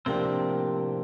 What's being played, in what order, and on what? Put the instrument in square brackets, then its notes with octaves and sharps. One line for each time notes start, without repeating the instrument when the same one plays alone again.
[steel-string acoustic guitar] A2 F3 A#3 D4 G4 [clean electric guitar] C3 C4